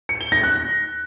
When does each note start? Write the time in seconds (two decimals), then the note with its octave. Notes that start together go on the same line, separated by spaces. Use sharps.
0.09 C#7
0.21 G7
0.32 A#6
0.43 F#6